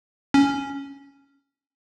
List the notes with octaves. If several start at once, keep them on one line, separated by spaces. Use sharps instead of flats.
C#4